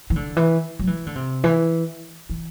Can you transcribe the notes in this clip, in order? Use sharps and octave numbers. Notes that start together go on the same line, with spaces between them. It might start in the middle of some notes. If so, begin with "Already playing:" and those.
E3
D3
E3
F#3
E3
D3
C3
E3
E3